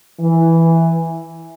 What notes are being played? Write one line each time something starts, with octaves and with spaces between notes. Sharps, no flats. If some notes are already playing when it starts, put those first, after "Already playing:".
E3